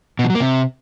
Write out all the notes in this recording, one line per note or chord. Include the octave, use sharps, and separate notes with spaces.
B2
F3
F#3
A#3
C3